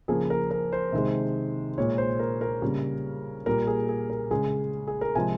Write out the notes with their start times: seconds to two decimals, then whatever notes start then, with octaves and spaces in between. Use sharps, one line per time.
0.08 C#3 F3 A#3 G#4
0.30 A#4
0.51 A#4
0.72 C5
0.92 C3 D#3 G#3
1.78 A#2 G#3 C#5
1.98 C5
2.19 A#4
2.41 A#4
2.62 C#3 G3 A#3
3.46 A#2 G3 A#3 A#4
3.67 G#4
3.89 G#4
4.10 A#4
4.31 C#3 G#3 G#4
4.87 G#4
5.01 A#4
5.15 C3 F3 G#3 G#5